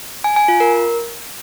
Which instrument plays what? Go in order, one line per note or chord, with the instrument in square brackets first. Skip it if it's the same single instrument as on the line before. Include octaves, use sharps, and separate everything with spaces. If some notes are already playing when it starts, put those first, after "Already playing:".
[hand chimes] G#5
G#5
F4
A#4